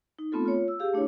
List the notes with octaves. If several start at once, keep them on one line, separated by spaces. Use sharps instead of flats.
D#4
A3 B3 C4 F4 A4
F4 C#5
E6
G4 G#4 F5
A3 D4 E4 C#5